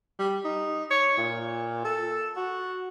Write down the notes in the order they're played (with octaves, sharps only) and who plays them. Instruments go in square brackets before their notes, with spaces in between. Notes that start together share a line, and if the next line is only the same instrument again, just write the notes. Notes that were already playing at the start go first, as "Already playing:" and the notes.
[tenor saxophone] G3
D#4
C#5
A#2
A4
F#4